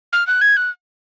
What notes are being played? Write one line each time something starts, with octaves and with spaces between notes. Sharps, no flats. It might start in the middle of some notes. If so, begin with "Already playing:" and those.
F6
F#6
G#6
F#6